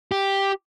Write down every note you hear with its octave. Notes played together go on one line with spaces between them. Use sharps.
G4